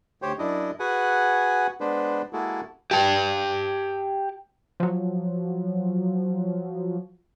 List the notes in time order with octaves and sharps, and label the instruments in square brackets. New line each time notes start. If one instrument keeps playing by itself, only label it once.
[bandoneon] D2 G4 C5 C#5 G5
F#2 D4 E4 D#5
F#4 G#4 B4 F#5 G#5
G#3 B3 D4 B4 C5
G#3 A#3 E4 F#4 G#4 A4
[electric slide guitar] G4 A5
[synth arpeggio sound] F3 F#3